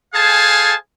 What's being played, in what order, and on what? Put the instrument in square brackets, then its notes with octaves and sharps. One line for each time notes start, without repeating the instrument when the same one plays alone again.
[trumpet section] G#4 A4 C5 F5 G#5 A5